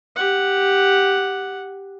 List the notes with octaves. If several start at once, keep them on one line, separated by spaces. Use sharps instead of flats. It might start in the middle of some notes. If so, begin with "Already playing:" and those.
G4 F#5